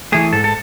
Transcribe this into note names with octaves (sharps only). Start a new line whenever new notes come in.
E3 A3 G#4
G#2 A4
A4